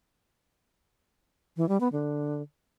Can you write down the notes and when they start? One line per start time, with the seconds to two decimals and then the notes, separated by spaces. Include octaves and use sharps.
1.57 E3
1.69 G3
1.80 B3
1.92 D3